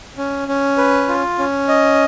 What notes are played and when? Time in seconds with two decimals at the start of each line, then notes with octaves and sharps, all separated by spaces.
0.18 C#4
0.48 C#4
0.78 B4
1.08 F4
1.39 C#4
1.68 D#5